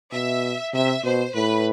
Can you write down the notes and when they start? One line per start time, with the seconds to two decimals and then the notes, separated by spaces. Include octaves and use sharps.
0.12 B2 E5
0.73 C3 E5
1.04 B2 C5
1.35 A2 B4